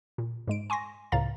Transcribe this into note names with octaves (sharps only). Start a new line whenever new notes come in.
A#2
G#2 G#3 D7
G#5 C6 C#6 A#6
C#2 A2 C#3 F5 A#5 A6